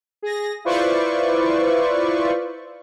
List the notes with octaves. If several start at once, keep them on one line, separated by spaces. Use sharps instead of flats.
G#4 A#6
E4 F4 B4 C5 D5 C#6